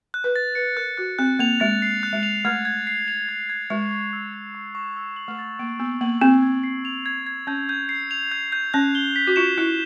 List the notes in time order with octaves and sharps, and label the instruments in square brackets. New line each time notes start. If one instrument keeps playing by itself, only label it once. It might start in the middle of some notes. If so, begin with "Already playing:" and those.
[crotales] F#6
[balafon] B4
[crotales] A6
[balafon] B4 [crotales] C#7
[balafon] A#4 [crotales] F#6
[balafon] F#4 [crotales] F#6
[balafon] C4 [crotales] F#6
[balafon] A#3 [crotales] F7
[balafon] G#3 [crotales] A6
[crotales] C7
F#6
[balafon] G#3
[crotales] F7
[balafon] A3 [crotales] G#6
[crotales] G#6
C7
F7
G#6
G#6
[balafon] G#3 [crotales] C#6
[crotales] C#6
E6
G#6
C#6
C#6
E6
F#7
[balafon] A3
[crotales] A6
[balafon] A#3 [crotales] D7
[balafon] B3 [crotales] E6
[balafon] A#3 [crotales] F#7
[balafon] C4 [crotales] G#6
[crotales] G#6
C7
F7
G#6
G#6
[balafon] C#4 [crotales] G6
[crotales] G6
C7
F7
G6
G6
[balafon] C#4 [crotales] F#6
[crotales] G7
B6
[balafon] F#4
[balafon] F4 [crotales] E7
[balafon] E4 [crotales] F#6